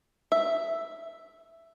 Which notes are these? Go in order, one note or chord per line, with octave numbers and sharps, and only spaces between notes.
E5